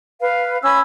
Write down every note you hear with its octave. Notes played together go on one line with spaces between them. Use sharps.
B4 F5
C#4 B5 E6